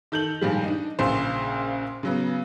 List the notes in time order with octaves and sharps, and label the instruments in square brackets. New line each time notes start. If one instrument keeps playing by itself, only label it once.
[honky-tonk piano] D#3 A4 G6 F7 F#7
G2 A#2 D#3 F3 G3 G#3
D4 D#4
A#1 A#2 C#3 C5 C6
C#3 F#3 B3